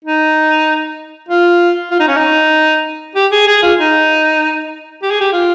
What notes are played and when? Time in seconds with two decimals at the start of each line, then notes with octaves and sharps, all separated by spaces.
0.05 D#4
1.29 F4
1.91 F4
2.00 D#4
2.08 C#4
2.17 D#4
3.15 G4
3.32 G#4
3.47 G#4
3.62 F4
3.78 D#4
5.02 G4
5.11 G#4
5.21 G4
5.33 F4